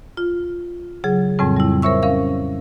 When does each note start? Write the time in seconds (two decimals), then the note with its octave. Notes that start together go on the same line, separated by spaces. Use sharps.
0.17 F4
1.04 C#3 F#3 G#4
1.39 F2 A2 C#3 G3 C4
1.57 G3 E4
1.82 A#4 C5 C#5 E5 C#6 E6
2.03 C#4 A#4 F5